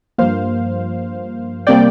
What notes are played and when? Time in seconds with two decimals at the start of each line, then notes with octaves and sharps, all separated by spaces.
0.18 G2 F3 A#3 C5 F5
1.67 C3 G3 A#3 D5 G5